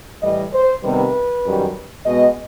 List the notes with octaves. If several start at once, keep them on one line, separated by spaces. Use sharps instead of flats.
A2 E3 G3 D#5
C5
C3 D#3 G3 B3 B4
F#2 D#3 G3
B2 G#3 B3 D#5